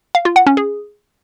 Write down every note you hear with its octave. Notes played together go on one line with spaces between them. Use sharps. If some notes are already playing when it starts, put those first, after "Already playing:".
F5
F4
F#5
C#4
G#4